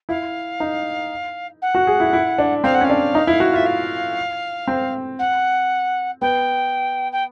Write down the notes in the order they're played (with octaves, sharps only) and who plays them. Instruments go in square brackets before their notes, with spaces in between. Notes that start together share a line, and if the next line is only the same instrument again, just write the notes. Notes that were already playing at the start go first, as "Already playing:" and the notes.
[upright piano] E4 [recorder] F5
[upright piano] D#4
[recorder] F#5
[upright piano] F#4
G#4
E4
E4
D4
[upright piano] C4 [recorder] F5
[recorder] F#5
[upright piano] C#4 [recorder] F5
[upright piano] D4
D#4
E4
F#4
[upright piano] F4 [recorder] E5
[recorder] F5
[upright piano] C4
[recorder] F#5
[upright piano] B3 [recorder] G5
[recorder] G5